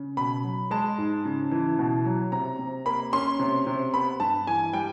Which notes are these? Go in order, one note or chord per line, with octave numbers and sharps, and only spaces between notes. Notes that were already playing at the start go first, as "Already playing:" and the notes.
Already playing: C#3
B2 B5
F#3
G#3 A5
G#2
C#3
E3
B2
F#3
C3 A#5
C3
A#3 B5
C#4 C6
C3
C3
B3 B5
G2 A5
E3 G#5
G3 G5